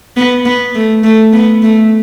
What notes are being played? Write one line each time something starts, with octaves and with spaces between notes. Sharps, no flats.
B3
B3
A3
A3
B3
A3